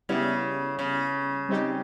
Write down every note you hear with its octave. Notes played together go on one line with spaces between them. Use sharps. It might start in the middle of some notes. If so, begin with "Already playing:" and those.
C#3 G3 B3 E4
C#3
G3 C4 D#4 G4